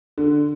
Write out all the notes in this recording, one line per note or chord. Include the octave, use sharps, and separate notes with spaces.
D3